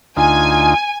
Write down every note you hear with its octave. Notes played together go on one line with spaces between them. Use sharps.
D2 D#4 F4 G#5